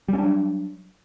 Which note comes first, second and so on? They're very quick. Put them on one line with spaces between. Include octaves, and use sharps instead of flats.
G3 C#4 D4 F#3